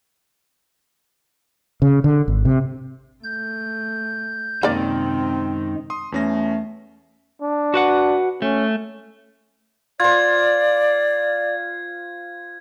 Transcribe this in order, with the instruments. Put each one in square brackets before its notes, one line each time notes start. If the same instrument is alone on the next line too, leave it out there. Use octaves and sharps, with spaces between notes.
[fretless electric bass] C#3
D3
G#1
C3
[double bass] A3 [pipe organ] G6
[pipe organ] F#2 G#3 [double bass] C3 C4 [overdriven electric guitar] D#3 [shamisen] A#3 D5
[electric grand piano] C6 D#6
[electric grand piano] E2 C#4 A#6 [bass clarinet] A3
[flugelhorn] D4
[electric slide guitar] F#4 B4 F#5
[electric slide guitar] A3 [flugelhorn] C#4
[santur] F4 C5 [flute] D5 [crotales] G#6